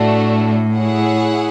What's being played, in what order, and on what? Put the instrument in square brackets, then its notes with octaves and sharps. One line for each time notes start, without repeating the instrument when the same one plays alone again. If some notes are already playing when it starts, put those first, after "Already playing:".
Already playing: [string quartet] A2 [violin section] A3 D4 F#4
[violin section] E4 G#4 C#5 F#5